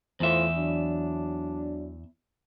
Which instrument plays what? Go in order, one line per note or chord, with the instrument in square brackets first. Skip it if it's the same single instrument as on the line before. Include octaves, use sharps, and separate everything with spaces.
[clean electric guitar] E2 E5 [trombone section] A2 F4 C5
[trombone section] F#3 D4